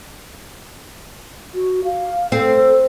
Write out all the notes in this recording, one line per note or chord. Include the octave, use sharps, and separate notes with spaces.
F#4
F5
C4 A4